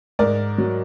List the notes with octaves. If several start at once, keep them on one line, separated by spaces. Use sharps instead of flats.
G#2 A#4 D5
F#3